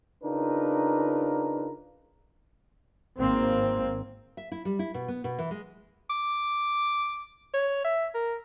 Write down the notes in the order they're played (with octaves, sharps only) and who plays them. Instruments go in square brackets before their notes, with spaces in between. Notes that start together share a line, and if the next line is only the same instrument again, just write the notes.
[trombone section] C#3 D4 D#4 F4 A#4 B4
[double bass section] G#1 A#3 C4
[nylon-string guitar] E5
E4
G3
E4
B2
B3
B2
E3
G#3
[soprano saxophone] D6
C#5
E5
A#4